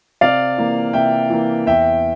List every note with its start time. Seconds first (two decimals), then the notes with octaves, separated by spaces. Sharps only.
0.21 C3 D5 F5
0.58 E3 A#3
0.93 C3 E5 G5
1.30 E3 A#3
1.67 E2 E5 G5